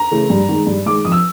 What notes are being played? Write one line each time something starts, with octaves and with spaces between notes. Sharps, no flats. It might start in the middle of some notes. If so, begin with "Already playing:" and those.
Already playing: A#5
C#3 E3 A3
G2
D#3 G#3
G2
D#3 G#3 D6
F2 D#6
E6